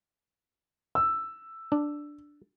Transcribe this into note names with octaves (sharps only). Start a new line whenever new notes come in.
E6
D4